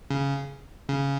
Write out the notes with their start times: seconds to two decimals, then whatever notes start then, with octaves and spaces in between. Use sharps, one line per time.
0.10 C#3
0.89 C#3